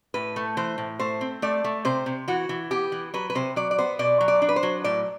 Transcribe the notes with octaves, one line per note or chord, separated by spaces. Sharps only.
A2 B4
A3
E3 C5
A2
A3 C5
C4
A3 D5
A3
C3 C5
C3
E3 F#4
E3
B3 G4
E3
F#3 B4
B4
C3 C5
F#3 D5
D5
B3 C5
B2 D5
F#3
D5
D4
B4
C5
F#3
A2 D5